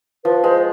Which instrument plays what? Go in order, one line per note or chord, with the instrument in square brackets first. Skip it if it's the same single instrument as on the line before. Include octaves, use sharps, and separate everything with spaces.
[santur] F3 [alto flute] B4
[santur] G#3 [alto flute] C5